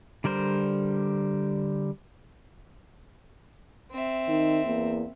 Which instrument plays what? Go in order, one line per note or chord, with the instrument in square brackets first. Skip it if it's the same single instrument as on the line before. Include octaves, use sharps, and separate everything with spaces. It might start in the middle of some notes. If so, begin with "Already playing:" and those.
[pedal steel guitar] D3 G3 A#4 C5
[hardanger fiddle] C4 E5
[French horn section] D#3 D#4
E2 A#3